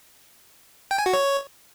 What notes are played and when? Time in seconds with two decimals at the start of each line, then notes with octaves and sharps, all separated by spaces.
0.91 G5
0.98 G#5
1.06 F#4
1.13 C#5